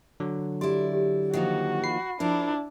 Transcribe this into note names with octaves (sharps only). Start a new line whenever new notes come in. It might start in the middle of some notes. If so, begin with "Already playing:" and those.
D3 F#3
E4 G4 D5 C6
G4
D#3 F3 A#3 F#4
B5 C7
F3 D4 E4 A#4